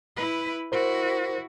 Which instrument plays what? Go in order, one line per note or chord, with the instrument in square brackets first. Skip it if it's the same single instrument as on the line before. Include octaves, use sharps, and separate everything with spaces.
[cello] E4 B4
[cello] E4 F#4 [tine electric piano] A#4 C5